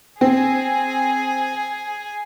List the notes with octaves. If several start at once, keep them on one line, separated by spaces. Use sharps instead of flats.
C4 G#4 G#5